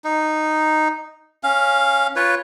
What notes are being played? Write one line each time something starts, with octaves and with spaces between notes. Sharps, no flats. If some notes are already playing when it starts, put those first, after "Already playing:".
D#4
C#4 F5
F4 B4 C#5